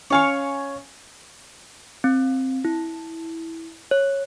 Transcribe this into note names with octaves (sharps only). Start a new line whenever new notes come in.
C#4 C#5 F5 G#5 C#6
C4
E4
C#5